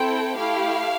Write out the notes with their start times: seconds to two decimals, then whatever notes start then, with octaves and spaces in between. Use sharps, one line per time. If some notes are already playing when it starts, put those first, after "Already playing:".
Already playing: C4 E4 A4 G5
0.37 A3 E4 G4 F5